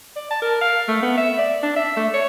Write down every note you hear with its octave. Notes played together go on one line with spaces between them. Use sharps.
D5
A5
A#4
F5
A3
B3
E5
D5
D4
E5
A3
C#5